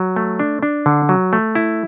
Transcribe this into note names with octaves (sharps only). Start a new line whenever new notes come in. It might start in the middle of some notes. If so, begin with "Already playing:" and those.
Already playing: F#3
A3
D4
D4
D3
F#3
A3
E4